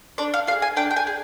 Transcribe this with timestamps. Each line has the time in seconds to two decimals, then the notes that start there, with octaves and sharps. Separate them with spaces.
0.18 D4 D5
0.34 F5
0.47 F4 F5
0.51 G#4
0.62 G#5
0.77 D4 G5
0.91 G5
0.96 G#5
1.07 G#4